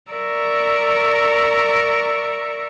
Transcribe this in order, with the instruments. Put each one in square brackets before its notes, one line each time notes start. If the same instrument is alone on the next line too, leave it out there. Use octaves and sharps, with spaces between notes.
[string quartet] A#4 D5 E5 A#5 C#6